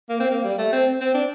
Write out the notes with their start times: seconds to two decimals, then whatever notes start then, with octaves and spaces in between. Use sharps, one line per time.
0.09 A#3
0.20 C4
0.30 A#3
0.44 G3
0.58 A3
0.72 C4
1.00 C4
1.14 D4